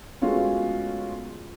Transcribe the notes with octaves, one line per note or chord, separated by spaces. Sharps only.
G#3 A3 B3 C#4 F4 F#4